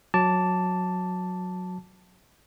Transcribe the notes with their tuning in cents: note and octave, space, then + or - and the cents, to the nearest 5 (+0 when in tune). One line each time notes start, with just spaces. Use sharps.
F#3 -15 A5 +5 D6 -15